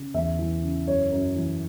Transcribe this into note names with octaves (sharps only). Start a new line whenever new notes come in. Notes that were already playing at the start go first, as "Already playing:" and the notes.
Already playing: C#3
E2 E5
E3
C#3
F#2 C#5
F#2
E3